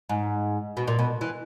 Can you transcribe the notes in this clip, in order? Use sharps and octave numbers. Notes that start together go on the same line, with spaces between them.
G#2
B2
A#2
B2
E3